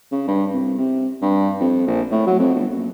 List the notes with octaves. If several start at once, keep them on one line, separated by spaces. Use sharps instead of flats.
C#3
G2
C2
C3
G2
F2
A#1
A2
F#3
F2
G1
F#1